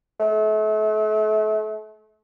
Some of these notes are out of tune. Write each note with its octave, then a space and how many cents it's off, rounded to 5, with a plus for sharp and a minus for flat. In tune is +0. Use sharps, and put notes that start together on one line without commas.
A3 -35